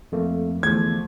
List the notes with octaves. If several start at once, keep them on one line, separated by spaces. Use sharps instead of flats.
F2 A3 A#3
E2 D3 F3 A3 G#6